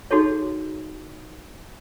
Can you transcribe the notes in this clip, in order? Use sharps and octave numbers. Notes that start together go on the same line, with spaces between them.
D#4 F#4 G#4 A4 C#5